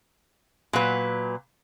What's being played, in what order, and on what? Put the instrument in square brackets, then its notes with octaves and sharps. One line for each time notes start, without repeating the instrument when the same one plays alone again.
[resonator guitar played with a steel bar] A#2 F#3 B4